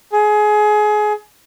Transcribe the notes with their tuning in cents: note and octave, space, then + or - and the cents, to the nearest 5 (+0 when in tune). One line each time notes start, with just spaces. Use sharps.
G#4 +25